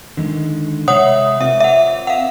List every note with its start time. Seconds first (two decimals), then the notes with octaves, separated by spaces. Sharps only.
0.17 D3 D#3 G#3
0.88 C3 G#3 C#5 E5 F#5 D#6
1.41 C4 F4 A#4 E5
1.60 E5 F#5
2.07 F5 F#5